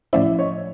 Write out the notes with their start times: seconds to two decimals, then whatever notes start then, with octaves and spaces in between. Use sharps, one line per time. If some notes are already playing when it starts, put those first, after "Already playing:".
0.13 A2 F3 A3 C#4 E4 D5 E5
0.39 C#5 D#5